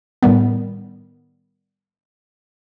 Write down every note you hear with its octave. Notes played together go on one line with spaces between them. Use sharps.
A2 D#3 G3 B3